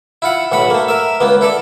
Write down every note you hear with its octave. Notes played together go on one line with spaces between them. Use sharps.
E4 F4 F#5
B1 A2 F#5 B5
A3 A#3
A#4 E5
C#2 A#3 B3
E4 A4 D5